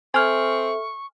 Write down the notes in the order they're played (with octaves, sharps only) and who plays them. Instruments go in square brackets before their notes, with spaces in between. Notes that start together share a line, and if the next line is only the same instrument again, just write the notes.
[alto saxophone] C4 [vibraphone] A4 E5 [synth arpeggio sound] G#5 F6 [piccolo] C#6